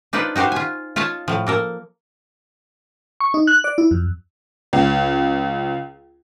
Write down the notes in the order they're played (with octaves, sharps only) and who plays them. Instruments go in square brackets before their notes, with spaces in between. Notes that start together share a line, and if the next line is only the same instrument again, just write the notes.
[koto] D4 D#4 F4 B4 C5 D5
D#4 F#4 G4 C5 F5
F4 G#5
F4 C#5 D#5 F5 A5
A2 F3
A#3 A4 A#4
[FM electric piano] C#6
D#4
F#6
D5
E4
F2
[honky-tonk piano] C#2